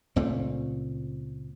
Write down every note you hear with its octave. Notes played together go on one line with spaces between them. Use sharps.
C#2 A#2 A3 C4